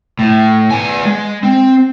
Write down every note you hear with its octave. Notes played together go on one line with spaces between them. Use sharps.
A2
B3 G#5
G#3
C4